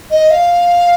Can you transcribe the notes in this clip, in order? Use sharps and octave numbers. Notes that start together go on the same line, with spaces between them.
D#5
F5